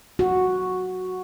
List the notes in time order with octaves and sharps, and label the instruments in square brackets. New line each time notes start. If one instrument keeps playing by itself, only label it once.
[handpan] F#4